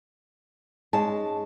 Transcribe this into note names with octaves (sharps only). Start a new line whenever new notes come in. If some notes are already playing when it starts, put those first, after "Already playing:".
G#2 G#3 C#4 A5